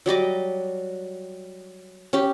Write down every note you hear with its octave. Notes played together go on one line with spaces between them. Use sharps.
F#3 G3 D#5 D6
C#4 G4